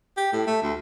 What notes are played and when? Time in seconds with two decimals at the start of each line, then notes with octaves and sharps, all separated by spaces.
0.17 G4
0.33 A2
0.47 A3
0.62 D2